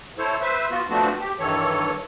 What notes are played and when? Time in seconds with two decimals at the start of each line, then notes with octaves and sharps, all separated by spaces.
0.18 E4 A4 C5 C#5
0.41 B4 C5 E5
0.71 B3 F4 F#4
0.89 F3 A3 B3 C4 D4 F#4
1.19 G4
1.40 G2 D#3 E3 A4 C#5